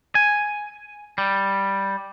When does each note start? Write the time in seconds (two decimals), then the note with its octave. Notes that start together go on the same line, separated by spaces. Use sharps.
0.15 G#5
1.18 G3